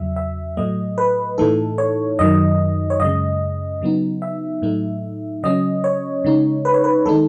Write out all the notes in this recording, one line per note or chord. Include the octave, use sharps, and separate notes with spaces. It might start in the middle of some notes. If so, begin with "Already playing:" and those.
Already playing: E2 C#3 F#3 E5
E5
A2 F#3 A3 D#5
B4
A2 E3 A3 D#4 A4
C#5
F#2 D#3 F#3 D#5
C#5
F#2 C#3 G#3 D#5
C#3 F#3 B3 D#4
E5
A2 F#3 A3 D#4
C#3 F#3 C#4 D#5
C#5
C#3 G#3 D#4
B4
C#5
B4
D#3 G#3 D#4 A4